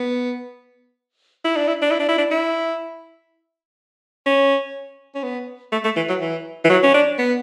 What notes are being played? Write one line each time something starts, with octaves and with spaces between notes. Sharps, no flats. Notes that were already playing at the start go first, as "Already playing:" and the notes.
Already playing: B3
E4
D4
E4
D4
E4
D4
E4
D4
E4
C#4
C#4
B3
A3
A3
E3
F#3
E3
E3
F#3
C#4
D4
B3